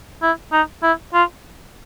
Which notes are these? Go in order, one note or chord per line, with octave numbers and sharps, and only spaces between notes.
E4
D#4
E4
F4